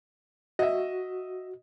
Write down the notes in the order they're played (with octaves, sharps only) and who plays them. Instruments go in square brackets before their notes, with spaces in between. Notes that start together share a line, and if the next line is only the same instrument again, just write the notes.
[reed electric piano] F#4 [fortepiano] D#5 E5